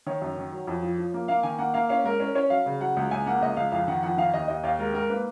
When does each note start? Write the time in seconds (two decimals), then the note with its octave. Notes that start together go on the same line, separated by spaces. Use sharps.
0.07 D#3 C#5
0.22 F#2
0.38 D#3
0.52 F#3
0.67 F2
0.83 F3
0.98 F3
1.14 A#3
1.28 A#3 F5
1.43 D#3 G#5
1.58 A#3 F#5
1.74 A#3 F5
1.89 C#4 F5
2.04 G#2 A#4
2.20 C#4 A#4
2.35 C#4 C#5
2.50 F#3 F5
2.66 C#3
2.81 F#3 F#5
2.97 C#2
3.11 C#2 G#5
3.26 A#3 F#5
3.41 C#2 D#5
3.57 C#2 F5
3.72 F2 F5
3.88 D#3 F#5
4.03 F2 F#5
4.18 D#3 F5
4.34 D#2 D#5
4.48 D#2 D#5
4.63 D#2 F5
4.79 G#3 A#4
4.94 G#2 A#4
5.10 A#3 B4